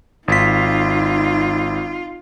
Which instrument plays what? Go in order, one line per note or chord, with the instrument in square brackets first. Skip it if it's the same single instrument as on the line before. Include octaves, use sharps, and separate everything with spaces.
[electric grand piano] G#1 B6 [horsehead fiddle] D#4 [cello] F4